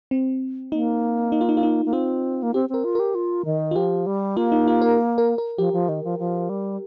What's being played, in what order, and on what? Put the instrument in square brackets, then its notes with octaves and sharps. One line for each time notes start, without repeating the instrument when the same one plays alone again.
[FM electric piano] C4
[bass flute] A#3 [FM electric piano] D#4
[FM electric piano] D#4
F4
D#4
F4
D#4
[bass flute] A#3
[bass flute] C4 [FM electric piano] F4
[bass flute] A#3
[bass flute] C4 [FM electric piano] G4
[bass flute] C4 [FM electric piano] A#4
[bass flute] F4
[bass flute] G4 [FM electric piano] A#4
[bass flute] F4
D#3
[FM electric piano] F4
[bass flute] F3 [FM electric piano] G4
[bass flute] G3
[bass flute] A#3 [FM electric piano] F4
[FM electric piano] D#4
F4
A#4
A#4
A#4
[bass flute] F3 [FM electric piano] G4
[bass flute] F3
D#3
F3
F3
G3